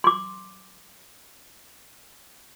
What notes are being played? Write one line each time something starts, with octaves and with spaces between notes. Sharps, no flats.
C6 D6